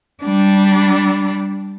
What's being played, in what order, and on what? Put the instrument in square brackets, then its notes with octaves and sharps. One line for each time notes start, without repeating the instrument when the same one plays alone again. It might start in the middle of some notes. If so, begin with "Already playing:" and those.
[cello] G3 D4